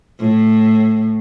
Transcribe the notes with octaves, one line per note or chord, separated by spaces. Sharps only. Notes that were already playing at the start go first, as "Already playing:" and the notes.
A2